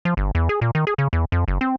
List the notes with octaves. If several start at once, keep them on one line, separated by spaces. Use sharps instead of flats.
F3
G1
E2
G#4
A#2
D#3
G#4
C#3
E2
F2
F#1
C4